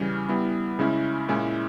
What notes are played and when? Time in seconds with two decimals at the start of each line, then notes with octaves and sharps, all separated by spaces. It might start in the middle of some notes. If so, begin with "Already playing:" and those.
Already playing: C#3 E3 G3 C#4
0.29 G3 B3 E4
0.79 C#3 G#3 C#4 E4
1.28 A#2 G#3 C#4 E4